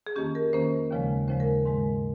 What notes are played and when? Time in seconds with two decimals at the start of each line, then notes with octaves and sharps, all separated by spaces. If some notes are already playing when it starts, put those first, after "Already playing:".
0.07 G#4
0.16 F2 D#3 A#3 C#4 G4
0.35 A#4
0.53 F2 D#3 A#3 C#4 C5
0.91 D#2 C#3 F3 G#3
1.28 D#2 C#3 F3 G#3 C5
1.40 A#4
1.65 G#2 D#3 G#3